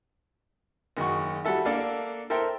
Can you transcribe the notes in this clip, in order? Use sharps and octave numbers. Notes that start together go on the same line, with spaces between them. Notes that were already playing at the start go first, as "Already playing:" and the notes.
F#1 D#3 G#3 F#4 C#6
G3 F#4 A4 E5
A#3 D4 A4 F5
A4 A#4 C5 E5 G5